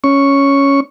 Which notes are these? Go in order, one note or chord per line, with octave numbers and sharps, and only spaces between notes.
C#4 C#6